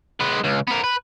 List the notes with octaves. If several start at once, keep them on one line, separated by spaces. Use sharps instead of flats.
G#3 B4
C#2
B3 A#4
B4